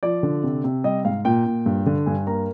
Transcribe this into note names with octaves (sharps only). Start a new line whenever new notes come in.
F3 D5
D3
C3
C3
G3 D#5
G#2 F5
A#2 G5
A#2
G2
D3
G2 G#5
A#3 A#5